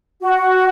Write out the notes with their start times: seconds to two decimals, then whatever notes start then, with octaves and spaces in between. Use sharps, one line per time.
0.21 F#4